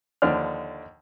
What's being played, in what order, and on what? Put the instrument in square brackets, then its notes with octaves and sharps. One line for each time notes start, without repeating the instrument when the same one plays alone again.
[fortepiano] D#2 D3 F3 D4 F6